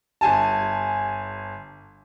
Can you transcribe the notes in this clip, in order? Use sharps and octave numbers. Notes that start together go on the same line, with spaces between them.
G1 G#5 A5